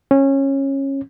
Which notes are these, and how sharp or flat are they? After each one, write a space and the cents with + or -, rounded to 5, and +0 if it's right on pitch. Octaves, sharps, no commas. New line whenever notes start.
C#4 -20